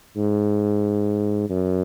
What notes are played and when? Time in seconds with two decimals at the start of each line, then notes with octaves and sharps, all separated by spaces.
0.17 G#2
1.50 F#2